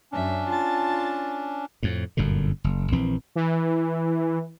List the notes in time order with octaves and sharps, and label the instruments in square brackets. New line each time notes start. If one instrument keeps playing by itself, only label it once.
[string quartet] F#2 E5 [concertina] C#4 D4
[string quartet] F4 A5 A6
[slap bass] F2 A2
G1 F#2 A#2 D3
F#1
A#1 E3 C4
[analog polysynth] E3